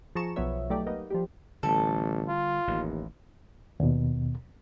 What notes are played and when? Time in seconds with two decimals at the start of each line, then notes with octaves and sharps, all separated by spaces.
0.15 F3 G#4 A5 A#5 C#6 E7
0.36 B1 F3 B3 C#5 E5
0.70 F#3 A3 D#4 G4 D5
0.86 A#3 B3 D#4
1.10 F3 G3 G4
1.63 A1 D3 G3 A4
2.28 F4
2.67 A1 D#2
3.80 D#2 B2